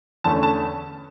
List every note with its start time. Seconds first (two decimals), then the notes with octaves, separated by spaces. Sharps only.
0.24 E2 D3 A3 C#4 A5
0.43 A5